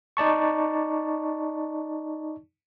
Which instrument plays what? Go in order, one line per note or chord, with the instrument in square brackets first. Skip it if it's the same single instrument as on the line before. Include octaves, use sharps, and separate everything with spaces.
[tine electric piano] D#4 D5 A5 C#6